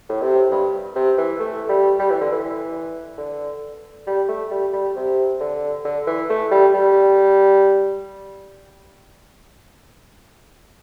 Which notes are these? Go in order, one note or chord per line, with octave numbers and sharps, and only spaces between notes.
A2
C3
G2
C3
E3
A3
G3
G3
E3
D3
E3
D3
G3
A3
G3
G3
C3
D3
D3
E3
A3
G3
G3